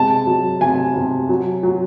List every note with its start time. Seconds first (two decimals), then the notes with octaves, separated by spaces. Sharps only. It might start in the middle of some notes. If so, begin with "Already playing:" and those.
Already playing: C3 G#3 A5
0.27 F#3
0.61 C3 G#5
0.95 C3
1.29 F#3
1.63 F#3